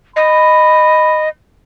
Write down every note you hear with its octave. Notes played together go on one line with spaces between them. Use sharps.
D#5 B5